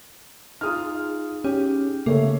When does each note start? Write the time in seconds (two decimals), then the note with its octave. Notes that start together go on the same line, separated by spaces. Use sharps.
0.61 D#4 F4 G#4 D#6 F6
1.44 C#4 G4
2.06 C#3 A3 A#3 A4 C#5 E5